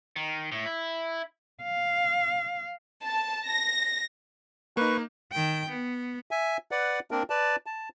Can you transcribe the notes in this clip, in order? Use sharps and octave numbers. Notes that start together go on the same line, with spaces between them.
D#3
A2
E4
F5
A5
A#6
A#3 D#4 B4 C#6
D#3 G5
B3
E5 G#5
B4 D5 F#5
A#3 C4 D4 A#4
B4 D5 A5
A5